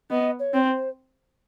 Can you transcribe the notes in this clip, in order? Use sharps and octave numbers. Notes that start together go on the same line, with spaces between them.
B3 D#5
C#5
C4
C5